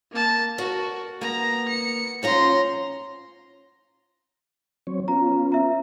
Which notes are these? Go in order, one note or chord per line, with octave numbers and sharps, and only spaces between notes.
A#3 A5
F#4 A#4 A5
A#3 B3 A#5
C#7
F3 C#4 F4 A#5 C6
F#3 C4 C#5
B3 C#4 F4 A#5
E5 A#5